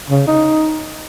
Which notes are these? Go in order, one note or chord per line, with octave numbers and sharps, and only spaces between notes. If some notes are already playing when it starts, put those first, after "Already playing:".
C#3
D#4